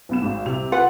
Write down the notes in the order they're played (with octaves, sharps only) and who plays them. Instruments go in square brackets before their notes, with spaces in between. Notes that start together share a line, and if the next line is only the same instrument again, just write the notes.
[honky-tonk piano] B1 B3 E7
G#1 G#2
C2 C3 F7
[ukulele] F4 B4 F#5